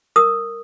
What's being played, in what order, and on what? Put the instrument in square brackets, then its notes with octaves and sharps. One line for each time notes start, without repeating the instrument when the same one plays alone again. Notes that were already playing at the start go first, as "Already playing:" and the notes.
[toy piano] A#4 D#6